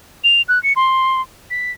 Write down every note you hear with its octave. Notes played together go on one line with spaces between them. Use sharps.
F7
F#6
C#7
C6
B6